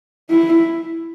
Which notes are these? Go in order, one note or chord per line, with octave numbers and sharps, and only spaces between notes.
E4